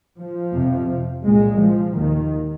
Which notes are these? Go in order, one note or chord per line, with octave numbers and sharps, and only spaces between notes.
F3
F2 C3
C2 A#2 G#3
F3
D#2 D#3